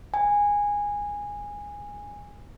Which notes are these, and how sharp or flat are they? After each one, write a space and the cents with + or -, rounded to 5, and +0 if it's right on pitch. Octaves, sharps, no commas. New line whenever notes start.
G#5 -15